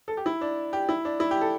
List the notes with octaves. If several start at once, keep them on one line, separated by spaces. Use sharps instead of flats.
A4
G4
E4
D4
G4
E4
D4
E4
G4
A4